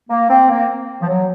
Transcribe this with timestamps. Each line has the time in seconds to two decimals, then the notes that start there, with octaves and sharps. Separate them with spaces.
0.09 A#3
0.29 C4
0.49 A#3
1.01 F3
1.08 F#3